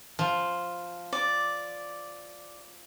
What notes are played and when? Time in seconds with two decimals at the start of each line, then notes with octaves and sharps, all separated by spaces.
0.19 F3
1.13 D5